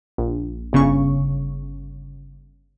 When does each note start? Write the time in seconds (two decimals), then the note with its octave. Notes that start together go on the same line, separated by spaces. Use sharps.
0.18 A#1
0.73 G1 C#3 C#4 C#6